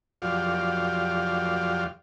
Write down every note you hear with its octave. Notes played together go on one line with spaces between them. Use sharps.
F2 F#3 F4 G4 D5 F5